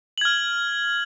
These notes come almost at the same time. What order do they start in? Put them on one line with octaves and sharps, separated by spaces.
F#7 G#6 F6